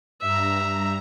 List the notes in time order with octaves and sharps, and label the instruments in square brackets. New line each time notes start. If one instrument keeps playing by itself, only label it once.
[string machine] G2 A#5 [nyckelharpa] E5